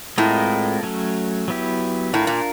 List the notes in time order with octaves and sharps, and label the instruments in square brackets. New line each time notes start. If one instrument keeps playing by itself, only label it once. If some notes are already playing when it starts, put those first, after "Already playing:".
[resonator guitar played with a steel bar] A2 [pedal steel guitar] G#3 C4 F4 A#4 D#5
[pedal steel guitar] F#3 A3 C#4
F#3 B3 E4 G4
[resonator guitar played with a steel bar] A2 [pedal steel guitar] D4 F4 A#4
[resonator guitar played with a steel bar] A#2